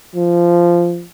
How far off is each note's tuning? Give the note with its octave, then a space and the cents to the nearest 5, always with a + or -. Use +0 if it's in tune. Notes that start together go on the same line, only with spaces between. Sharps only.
F3 -15